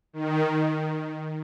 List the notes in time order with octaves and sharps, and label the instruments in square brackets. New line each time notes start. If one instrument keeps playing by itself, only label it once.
[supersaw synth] D#3